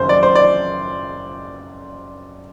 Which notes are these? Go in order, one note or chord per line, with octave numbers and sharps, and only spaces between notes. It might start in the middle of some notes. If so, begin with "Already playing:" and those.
Already playing: F#1 F#2 D#3 C5
D5
C5
D5